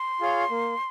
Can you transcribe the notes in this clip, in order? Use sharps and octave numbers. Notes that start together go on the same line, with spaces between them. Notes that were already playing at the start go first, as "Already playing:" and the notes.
Already playing: C6
F4 G#4 C#5 F5
A#3